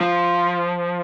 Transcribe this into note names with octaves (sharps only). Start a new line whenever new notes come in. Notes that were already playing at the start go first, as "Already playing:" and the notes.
F3